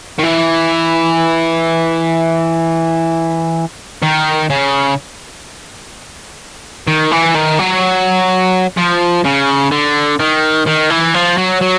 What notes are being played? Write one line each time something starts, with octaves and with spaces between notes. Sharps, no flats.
D#3
E3
D#3
C#3
D#3
E3
D#3
F#3
F3
C#3
D3
D#3
D#3
E3
F3
F#3
F#3